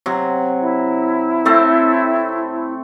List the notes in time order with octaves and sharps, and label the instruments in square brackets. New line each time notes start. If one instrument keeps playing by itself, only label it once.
[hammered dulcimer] C3 F#3
[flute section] E4
[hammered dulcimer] A3 C4 A4